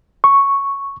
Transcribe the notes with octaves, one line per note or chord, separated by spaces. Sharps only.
C#6